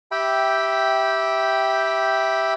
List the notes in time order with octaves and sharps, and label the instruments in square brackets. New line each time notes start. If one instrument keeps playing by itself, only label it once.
[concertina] G4 E5 G5 B5